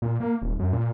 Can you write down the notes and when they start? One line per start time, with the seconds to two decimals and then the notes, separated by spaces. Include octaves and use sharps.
0.02 A#2
0.20 A#3
0.42 D#1
0.59 F#2
0.73 A#2